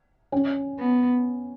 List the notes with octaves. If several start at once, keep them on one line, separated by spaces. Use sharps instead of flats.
C#4
B3